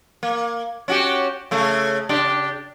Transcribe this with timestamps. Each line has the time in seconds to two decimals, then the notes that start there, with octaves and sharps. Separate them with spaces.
0.23 A#3
0.88 C#4 F#4 G4
1.51 C#3 A3
2.09 C#3 D4 G4